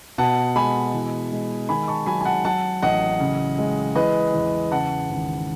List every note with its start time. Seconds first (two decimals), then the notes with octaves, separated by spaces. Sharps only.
0.18 B2 F#5 A5
0.56 G#3 G#5 B5
0.94 E3
1.32 G#3
1.69 D#3 G#5 B5
1.88 A5 C#6
2.06 F#3 G#5 B5
2.21 G#5
2.25 F#5 A5
2.45 F#3 F#5 A5
2.83 A1 D#5 F#5
3.20 C#3
3.58 G#3
3.95 E3 B4 D#5
4.34 E2
4.72 C#3 F#5 A5
5.09 G#1